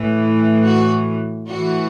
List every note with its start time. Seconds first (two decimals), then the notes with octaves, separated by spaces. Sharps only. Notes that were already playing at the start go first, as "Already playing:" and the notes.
Already playing: A2 E3
0.65 F#4
1.47 A2 E3 F#4